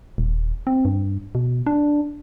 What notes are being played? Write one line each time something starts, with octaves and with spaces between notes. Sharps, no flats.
D#1
C4
G2
B2
D4